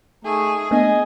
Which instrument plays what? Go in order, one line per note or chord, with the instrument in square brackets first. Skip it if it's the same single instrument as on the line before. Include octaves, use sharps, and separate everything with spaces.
[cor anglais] A3 [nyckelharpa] D#4 [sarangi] G#4
[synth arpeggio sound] A3 B3 D4 [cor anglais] D#5 [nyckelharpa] G#5